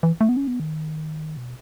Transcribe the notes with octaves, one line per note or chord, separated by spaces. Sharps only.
E3
A3
B3
C#4
B3
D#3
B2